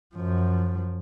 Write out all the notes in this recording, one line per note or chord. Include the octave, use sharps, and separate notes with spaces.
F#2 F3